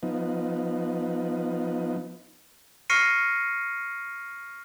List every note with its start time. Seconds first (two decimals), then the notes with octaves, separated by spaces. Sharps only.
0.03 F3 B3 D#4
2.90 C#6 F6 A#6 C7 C#7 D#7